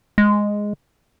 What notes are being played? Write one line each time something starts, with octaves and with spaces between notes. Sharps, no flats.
G#3